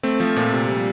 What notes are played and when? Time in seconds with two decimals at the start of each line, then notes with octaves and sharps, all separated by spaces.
0.03 A3 C4
0.20 F3
0.36 A#2
0.53 C3
0.68 G3